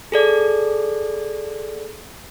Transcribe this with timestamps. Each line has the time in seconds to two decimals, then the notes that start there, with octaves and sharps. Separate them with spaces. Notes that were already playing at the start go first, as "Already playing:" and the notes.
0.12 G#4 A4 D5